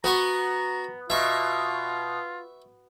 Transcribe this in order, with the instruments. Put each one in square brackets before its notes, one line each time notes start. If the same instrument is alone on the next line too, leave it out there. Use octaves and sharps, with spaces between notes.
[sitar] B3 [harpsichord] F#4 C#6 [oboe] A#5
[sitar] B2 [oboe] F4 [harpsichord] E5 C#6